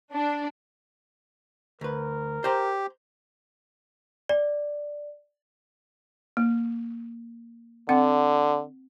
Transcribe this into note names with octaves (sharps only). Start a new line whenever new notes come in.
D4
D2 A#4 B4
G4 C5 A#5
D5
A#3
D3 C4 F#5